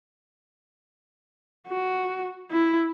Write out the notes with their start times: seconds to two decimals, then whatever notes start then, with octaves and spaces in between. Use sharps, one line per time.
1.68 F#4
2.52 E4